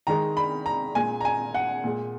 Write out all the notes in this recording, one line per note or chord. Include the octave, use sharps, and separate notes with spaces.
D#3 G#3 A#5
B5
A#5
A#2 G#3 G#5
A#5
G#5
F#5
A#2 G#3